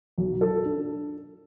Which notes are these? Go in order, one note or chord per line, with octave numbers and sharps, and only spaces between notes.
B1
A4
D4